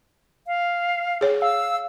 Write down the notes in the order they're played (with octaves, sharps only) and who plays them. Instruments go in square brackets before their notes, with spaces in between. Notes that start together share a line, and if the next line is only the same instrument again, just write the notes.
[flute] F5
[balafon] G#4 C#5
[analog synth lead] F5 [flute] E6